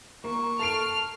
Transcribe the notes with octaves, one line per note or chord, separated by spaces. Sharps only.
A#3 C#6
A4 A5 F6 C7 D7